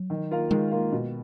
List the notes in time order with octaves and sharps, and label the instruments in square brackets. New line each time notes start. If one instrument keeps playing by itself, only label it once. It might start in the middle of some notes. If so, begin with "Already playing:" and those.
Already playing: [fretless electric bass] F#3
[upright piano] D#3
A#3 F4 A#4 F5
[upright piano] D#3 [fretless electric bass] G#3
[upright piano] A#3 F4 A#4 F5
B2